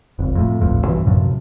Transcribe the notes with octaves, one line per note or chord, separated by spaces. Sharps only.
F1 C#2
F2 A2
D#1 A1 F2 A2
B1 G2 E3
F#2 A2 C3 F3